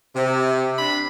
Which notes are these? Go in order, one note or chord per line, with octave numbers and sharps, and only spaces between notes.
C3
D4 B5